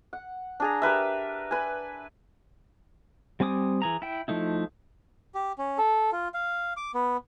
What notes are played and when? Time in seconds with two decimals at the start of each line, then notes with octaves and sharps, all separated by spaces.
0.13 F#5
0.60 D4 G#4 A#5
0.82 G4 A#4 B4 E5
1.51 B4 G#5
3.40 G3 C4 G#5 D6 D#6
3.82 E3 G#4 A#5
4.02 E4 G5
4.28 F3 A3 D#4 E4
5.35 G4
5.58 C#4
5.78 A4
6.12 F4
6.34 F5
6.77 D6
6.94 B3